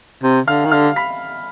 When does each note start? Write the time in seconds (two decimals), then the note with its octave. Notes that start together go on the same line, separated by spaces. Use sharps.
0.23 C3
0.47 D3 F5 F6
0.65 D#3
0.72 D3 F5 F6
0.96 B5 B6